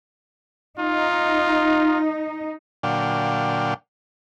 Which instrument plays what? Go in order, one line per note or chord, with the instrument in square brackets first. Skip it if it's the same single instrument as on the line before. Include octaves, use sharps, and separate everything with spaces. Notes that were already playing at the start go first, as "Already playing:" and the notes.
[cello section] D#4 [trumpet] F4
[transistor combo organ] A#2 D3 F#3 D4 F5 G5